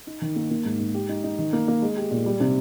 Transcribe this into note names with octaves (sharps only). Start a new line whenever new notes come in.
D#4
D#3
A#3
A#3
G#2
G#2
G4
D#4
D#4
D#3
A#3
A#3
G#3
G4
A#2
G3
C3